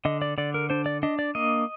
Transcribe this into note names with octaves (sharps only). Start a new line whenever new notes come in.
D3 D#5
D5
D3 D5
A#4
D4 C5
D5
D4 D#5
D5
A#3 D#5